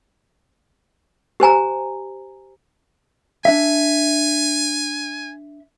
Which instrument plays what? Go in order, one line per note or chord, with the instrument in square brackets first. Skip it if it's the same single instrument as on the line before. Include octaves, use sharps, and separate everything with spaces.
[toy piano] G4 C5 G#5 A#5
[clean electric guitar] D4 E5 [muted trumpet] G#5